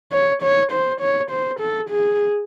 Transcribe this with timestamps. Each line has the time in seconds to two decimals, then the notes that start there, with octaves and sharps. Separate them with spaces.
0.12 C#5
0.42 C#5
0.72 C5
1.01 C#5
1.31 C5
1.60 A4
1.90 G#4